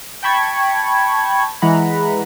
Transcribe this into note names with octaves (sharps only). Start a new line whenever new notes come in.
G5 A5 B5 C#6 G#6
E3 G#3 F#5 A#5 B5